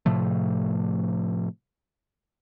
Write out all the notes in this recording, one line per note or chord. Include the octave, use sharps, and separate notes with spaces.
A2 C3 F3 A3